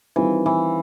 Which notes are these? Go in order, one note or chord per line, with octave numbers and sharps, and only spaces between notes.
D#3 E3 G3 C4 F4
E3